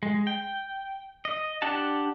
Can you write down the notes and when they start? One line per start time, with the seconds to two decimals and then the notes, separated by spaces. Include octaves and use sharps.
0.03 G#3
0.27 G5
1.25 D#5
1.62 D4 G4 F#5 A5